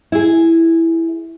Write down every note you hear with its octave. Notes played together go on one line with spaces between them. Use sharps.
E4 G#4